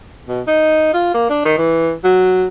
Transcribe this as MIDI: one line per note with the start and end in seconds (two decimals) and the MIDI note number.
0.28 0.41 47
0.47 0.92 63
0.94 1.10 65
1.14 1.29 58
1.30 1.43 62
1.45 1.55 51
1.58 1.93 52
2.04 2.46 54